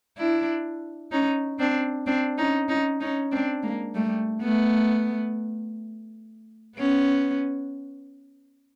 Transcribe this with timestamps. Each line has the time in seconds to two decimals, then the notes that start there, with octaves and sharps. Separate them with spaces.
0.17 D4 E4
1.11 C#4 D#4
1.59 C4 D4
2.06 C4 D4
2.38 C#4 D#4
2.69 C#4 D#4
3.00 C#4 D#4
3.32 C4 D4
3.63 G#3 A#3
3.95 G3 A3
4.42 A3 B3
6.77 B3 C#4